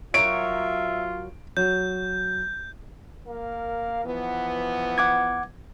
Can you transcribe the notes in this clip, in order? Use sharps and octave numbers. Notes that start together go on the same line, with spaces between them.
F#3 F4 A#4 C#5 E5 D7
F#3 G6
A#3 A#4 F5
E3 F3 B3
F#5 D6 G#6